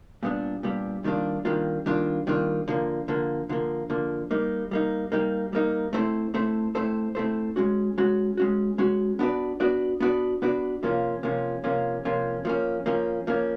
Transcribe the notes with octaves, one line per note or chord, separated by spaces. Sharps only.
A#2 G3 B3 D4
A#2 G3 B3 D4
D#3 G3 A#3 D4 F4
D#3 G3 A#3 D4 F4
D#3 G3 A#3 D4 F4
D#3 G3 A#3 D4 F4
D3 F3 A#3
D3 F3 A#3
D3 F3 A#3
D3 F3 A#3
G3 A#3 D#4
G3 A#3 D#4
G3 A#3 D#4
G3 A#3 D#4
A3 C4 E4 A4 C5
A3 C4 E4 A4 C5
A3 C4 E4 A4 C5
A3 C4 E4 A4 C5
G#3 C#4 F#4
G#3 C#4 F#4
G#3 C#4 F#4
G#3 C#4 F#4
B3 D4 F#4 B4 D5
B3 D4 F#4 B4 D5
B3 D4 F#4 B4 D5
B3 D4 F#4 B4 D5
C3 F3 A#3 C#4 F4
C3 F3 A#3 C#4 F4
C3 F3 A#3 C#4 F4
C3 F3 A#3 C#4 F4
F3 A#3 C#4
F3 A#3 C#4
F3 A#3 C#4